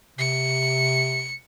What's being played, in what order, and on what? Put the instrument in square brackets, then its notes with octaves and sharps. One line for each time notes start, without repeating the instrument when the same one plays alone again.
[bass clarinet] C3 [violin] C#7